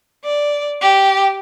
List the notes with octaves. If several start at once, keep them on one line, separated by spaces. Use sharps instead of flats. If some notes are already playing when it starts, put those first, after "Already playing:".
D5
G4